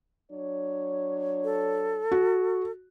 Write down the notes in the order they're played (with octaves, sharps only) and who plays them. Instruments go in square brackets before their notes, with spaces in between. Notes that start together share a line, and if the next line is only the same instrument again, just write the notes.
[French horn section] F#3 D4 C#5
[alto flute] A4
[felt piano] F#4